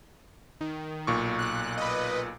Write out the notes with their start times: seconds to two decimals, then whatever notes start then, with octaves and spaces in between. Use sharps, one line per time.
0.61 D#3
1.07 B1 A#2 C#6
1.39 F#6
1.78 B4 D#5